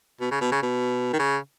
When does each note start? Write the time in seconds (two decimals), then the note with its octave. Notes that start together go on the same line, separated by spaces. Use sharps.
0.21 B2
0.31 C#3
0.41 B2
0.52 C#3
0.63 B2
1.13 D#3
1.19 C#3